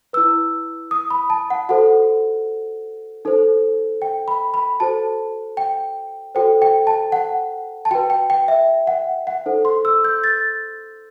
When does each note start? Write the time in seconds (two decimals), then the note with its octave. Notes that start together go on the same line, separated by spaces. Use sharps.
0.13 E4 B4 E6
0.91 D#6
1.10 B5
1.30 A5
1.50 F#5
1.69 F#4 A4 C5 F#5
3.25 D#4 A4 C5
4.02 G5
4.28 B5
4.54 B5
4.80 F#4 A4 C5 A5
5.57 G5
6.35 F#4 A4 C5 G5
6.62 G5
6.87 A5
7.12 F#5
7.85 A5
7.91 F#4 B4 G5
8.10 G5
8.30 G5
8.48 E5
8.87 F#5
9.27 F#5
9.46 D#4 A4 C5
9.65 C6
9.85 E6
10.05 G6
10.24 A6